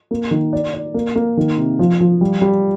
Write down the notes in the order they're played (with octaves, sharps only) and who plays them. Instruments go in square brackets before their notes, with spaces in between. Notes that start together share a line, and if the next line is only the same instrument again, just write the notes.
[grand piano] A#3
D#3
D5
D5
A#3
A#3
D#3
C3
F3
F3
G3
G3